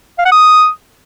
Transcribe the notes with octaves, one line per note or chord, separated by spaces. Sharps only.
F5
F#5
D#6